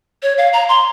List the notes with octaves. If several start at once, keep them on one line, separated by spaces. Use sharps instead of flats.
C#5
F5
A#5
C6